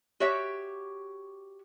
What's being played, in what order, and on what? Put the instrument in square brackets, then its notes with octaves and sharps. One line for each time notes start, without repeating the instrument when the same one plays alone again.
[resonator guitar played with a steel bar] F#4 G4 C#5 E5